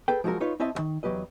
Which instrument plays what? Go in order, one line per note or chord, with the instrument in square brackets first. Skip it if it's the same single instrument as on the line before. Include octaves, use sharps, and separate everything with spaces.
[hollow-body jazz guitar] G#4 A4 B4 G5
F3 F#3 G#3 F#4 A#4
D#4 F4 B4 C#5
C4 E4 C#5 D#5 E5 A5
C#2 D#3
E2 F#3 G4 B4 D#5